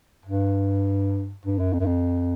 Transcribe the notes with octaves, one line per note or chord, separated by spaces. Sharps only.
G2
G2
F#2
F2
F#2
F2